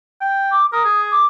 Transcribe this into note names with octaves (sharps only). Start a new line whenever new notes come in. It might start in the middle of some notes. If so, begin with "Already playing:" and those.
G5
D6
A#4 D#6
G#4
D6